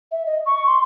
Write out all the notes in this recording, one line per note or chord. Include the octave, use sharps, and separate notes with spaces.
E5
D#5
C#6
C6